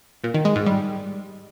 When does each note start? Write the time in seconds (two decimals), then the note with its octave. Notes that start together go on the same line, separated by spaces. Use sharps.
0.24 A#2
0.34 D#3
0.45 G#3
0.56 G#2
0.66 G3